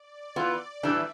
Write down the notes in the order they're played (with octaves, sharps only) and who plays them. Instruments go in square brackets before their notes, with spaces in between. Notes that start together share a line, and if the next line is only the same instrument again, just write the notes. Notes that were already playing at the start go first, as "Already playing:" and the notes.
Already playing: [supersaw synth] D5
[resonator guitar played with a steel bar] E3 B3 F4 [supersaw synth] D5
[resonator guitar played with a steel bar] A2 E3 G3 D4 [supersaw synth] E5